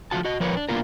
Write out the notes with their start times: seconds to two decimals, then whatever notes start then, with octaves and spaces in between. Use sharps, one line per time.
0.11 F3 G#3 A3 F4 F#4 A5
0.25 F#4 D#5
0.40 F3 A#4 B4 C#5
0.57 D4
0.69 A#3 B3 D4 F4 A#4